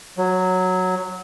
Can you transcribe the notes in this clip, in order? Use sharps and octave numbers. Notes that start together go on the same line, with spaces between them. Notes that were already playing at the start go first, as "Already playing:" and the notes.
F#3